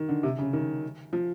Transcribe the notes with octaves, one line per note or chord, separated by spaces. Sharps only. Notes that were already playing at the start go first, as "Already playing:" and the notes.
Already playing: D#3
D3
C3
C#3
D#3
F3